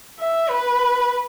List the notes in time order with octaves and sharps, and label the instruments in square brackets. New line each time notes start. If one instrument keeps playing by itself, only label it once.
[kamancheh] E5
B4